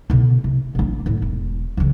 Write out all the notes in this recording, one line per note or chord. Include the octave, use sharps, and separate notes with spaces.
B2 D3
C3
A1 D4
A2 D3
E1
C#3 E3